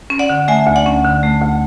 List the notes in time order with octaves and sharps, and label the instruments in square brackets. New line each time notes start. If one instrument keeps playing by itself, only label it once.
[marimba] C#4
D5 F#5
D3
A3 E5 G#5
D2
D5 F#5
C#4
D3
A3
D2